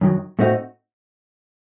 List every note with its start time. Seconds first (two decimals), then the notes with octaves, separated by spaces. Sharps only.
0.01 F#2 D#3 F#3
0.39 A2 A3 C4 D#4 F#4